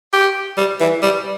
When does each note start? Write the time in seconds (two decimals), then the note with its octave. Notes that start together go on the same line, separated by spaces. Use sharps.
0.13 G4
0.57 G3
0.80 E3
1.02 G3